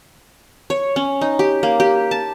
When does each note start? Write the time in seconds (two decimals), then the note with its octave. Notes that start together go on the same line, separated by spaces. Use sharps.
0.70 C#5
0.96 C#4
1.21 D#4
1.39 G4
1.63 A#3
1.80 G4
2.11 A5